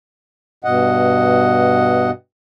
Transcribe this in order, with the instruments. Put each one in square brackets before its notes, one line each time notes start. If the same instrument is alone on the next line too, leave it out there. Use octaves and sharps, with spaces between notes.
[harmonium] G2 B2 D#5 F#5